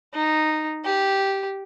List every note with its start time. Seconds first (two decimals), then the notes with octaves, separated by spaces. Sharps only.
0.14 D#4
0.85 G4